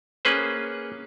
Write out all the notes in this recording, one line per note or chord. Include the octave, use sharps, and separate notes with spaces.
A#3 C#4 G#4 B4 C5